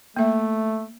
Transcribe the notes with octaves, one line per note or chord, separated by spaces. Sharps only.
A3 A#3 E5